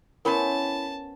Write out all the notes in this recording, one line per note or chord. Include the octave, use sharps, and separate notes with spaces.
B3 C#4 E4 A#4 C5 A5 B5